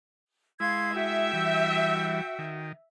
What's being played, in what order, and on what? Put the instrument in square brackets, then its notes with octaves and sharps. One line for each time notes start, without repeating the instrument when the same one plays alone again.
[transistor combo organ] G#3 E4 [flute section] F5 C6 G#6
[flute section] F#4 G5 [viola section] E5
[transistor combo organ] E3 G3
D#3